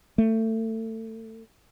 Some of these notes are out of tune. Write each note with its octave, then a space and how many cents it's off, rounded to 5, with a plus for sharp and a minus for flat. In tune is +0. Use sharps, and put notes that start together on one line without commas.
A3 +25